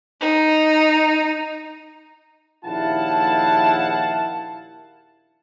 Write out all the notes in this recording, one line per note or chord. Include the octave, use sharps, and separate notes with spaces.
D#4
A#1 D#2 E4 F5 F#5 A5